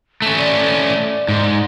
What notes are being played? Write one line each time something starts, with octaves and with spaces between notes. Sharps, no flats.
A3 C#4
D5
G#2